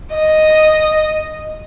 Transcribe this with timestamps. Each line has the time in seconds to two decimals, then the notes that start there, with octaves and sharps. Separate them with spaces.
0.15 D#5